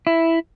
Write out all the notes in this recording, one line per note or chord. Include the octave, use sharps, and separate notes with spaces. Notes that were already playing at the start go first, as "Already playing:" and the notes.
E4